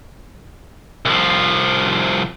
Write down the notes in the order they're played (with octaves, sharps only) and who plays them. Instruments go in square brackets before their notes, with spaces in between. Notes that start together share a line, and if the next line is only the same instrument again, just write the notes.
[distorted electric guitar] C2 F3